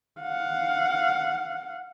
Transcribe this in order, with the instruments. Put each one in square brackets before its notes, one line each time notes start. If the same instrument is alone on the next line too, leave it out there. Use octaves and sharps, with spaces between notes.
[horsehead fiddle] F5 F#5